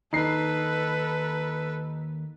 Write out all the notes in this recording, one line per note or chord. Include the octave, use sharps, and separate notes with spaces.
D#2 D#4 A4 B4 C7